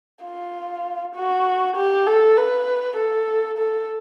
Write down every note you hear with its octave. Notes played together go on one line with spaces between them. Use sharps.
F4
F#4
G4
A4
B4
A4
A4